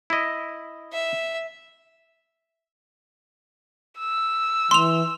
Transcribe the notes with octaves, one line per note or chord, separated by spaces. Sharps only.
E4 D#5
E5
E6
E3 C6 F7